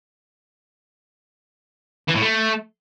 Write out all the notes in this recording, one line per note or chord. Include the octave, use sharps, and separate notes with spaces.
E3
A2
A3